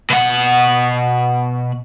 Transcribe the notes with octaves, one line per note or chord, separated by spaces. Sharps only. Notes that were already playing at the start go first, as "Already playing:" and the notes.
B2 F#5